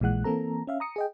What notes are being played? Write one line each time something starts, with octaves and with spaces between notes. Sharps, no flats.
A#1 A#2 E3 G#3 F#5 F#6
E3 A#3 C4 A4 A#5
C#4 E5 F5
A#5 D#6 C#7
G#4 D#5 G5